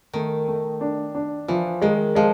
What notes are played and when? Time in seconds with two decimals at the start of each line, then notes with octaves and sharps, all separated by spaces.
0.13 D#3 A3
0.47 A3
0.81 D4
1.15 D4
1.48 E3 F3
1.82 D#3 G#3
2.15 F3 G#3